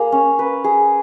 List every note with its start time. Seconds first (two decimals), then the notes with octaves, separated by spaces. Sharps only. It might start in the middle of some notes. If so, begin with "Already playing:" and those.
Already playing: A#3 G#4
0.12 C#4
0.39 B4
0.64 G#4